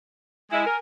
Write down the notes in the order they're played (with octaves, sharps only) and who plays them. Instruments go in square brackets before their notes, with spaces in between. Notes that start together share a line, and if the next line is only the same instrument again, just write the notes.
[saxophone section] G#3 E4 [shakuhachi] G#5
[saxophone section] A#4